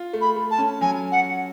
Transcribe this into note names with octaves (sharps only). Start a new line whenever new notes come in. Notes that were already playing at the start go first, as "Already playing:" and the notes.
Already playing: F4
A3
B5
A3
A5
C#4
F#3 G#5
F#5